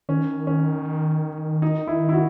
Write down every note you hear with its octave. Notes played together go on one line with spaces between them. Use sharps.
D#3 C#4
C#4
D#4
E4
E4
F#4